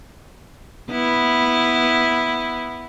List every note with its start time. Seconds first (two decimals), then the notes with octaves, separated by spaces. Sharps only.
0.91 B3 E4